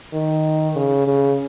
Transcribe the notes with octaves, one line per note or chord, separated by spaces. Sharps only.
D#3
C#3
C#3